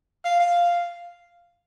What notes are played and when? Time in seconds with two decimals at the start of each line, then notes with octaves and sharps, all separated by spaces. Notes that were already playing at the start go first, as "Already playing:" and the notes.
0.25 F5
0.40 F5